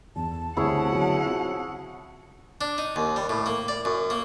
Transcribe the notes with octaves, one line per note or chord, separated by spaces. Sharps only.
E2 A5
D2 C#3 G3 C4 E4 G#4 C#5 F#5
D3 F#3 B3
C4 F4 F#4
D4
D#4
D#2
G3
A2
A#3
D5
F#2
A#3